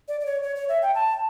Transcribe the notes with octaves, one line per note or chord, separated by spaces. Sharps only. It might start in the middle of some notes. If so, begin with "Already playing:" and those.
D5
D5
C#5
C#5
C#5
E5
G5
A5